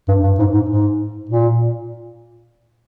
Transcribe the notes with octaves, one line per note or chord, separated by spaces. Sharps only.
G2
G2
G#2
G#2
G#2
A#2